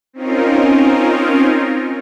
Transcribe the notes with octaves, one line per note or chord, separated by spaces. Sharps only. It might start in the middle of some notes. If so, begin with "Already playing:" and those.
C4 C#4 D#4 F4 A#4